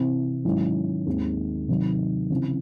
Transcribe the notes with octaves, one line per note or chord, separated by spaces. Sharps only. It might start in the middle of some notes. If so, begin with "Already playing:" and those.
Already playing: C3 E3 C4 E4
G#2 D#3 F#3 C#4 E4
D#2 D#3 G#3 C4
C3 D#3 F#3
C#3 E3 C4